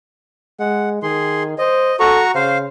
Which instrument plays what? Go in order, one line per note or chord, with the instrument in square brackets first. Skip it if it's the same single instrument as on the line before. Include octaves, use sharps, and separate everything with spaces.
[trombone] G#3 [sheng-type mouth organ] F#5
[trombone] D#3 [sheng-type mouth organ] G#4 C6
[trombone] C5 [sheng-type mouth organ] D#5
[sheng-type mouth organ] F#4 A#5 C#6 [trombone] A4
[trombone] C#3 [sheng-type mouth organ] C5 F5